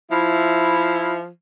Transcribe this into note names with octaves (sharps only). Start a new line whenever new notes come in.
F3 E4